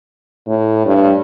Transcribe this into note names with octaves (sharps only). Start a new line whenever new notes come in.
A2
G2